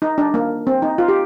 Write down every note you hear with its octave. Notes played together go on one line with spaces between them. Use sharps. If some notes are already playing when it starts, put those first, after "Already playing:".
D#4
D4
A#3
C4
D#4
F4
G4